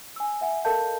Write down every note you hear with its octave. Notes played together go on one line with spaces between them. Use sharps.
G#5 E6
E5 F#5 G#5
A4 A#4 D#5 F5 A5 G6